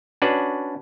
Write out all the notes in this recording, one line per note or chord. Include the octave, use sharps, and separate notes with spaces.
C#4 D4 F#4 B4 D5